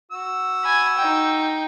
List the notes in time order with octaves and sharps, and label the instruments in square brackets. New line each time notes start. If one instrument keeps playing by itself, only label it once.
[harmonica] F#4 E6
[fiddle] G#5 B5
D#4 G5